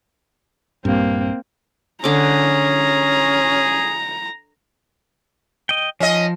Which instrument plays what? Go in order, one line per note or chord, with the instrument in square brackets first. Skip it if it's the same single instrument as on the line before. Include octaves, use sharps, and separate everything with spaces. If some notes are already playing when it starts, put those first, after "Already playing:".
[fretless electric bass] A#1 G2 [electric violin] A#3 C4
[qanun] D3 D6 [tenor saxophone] C#4 [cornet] G#4 [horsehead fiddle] A#5
[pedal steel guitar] D#5 G5
[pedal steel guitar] F3 [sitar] C#4 D#5